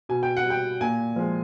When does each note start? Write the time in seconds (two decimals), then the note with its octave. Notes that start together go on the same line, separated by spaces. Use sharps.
0.09 B2 G#5
0.23 G5
0.37 F#5
0.45 G3 G5
0.81 A#2 G#5
1.16 F3 G#3